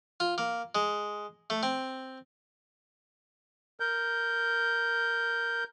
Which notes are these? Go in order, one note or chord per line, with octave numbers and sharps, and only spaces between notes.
F4
A#3
G#3
A3
C4
A#4 G6